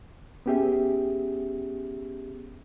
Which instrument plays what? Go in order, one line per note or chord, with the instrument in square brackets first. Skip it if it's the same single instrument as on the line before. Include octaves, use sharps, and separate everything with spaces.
[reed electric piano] B3 C#4 G4 G#4 E5